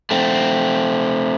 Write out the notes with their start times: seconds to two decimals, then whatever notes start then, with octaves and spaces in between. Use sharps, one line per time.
0.11 A3 C4